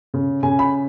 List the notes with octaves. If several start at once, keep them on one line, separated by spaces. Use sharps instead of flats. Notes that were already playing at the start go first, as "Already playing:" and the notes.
C#3
C#3 G#5
B5